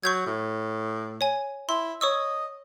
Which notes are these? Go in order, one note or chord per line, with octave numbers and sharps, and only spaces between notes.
F#3 C#6 G6 G#6
A2
C#5 G#5
E4 C6
C#5 D#5 C#6 E6